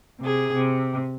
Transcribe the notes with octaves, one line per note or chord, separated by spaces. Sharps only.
C3 G#4
C3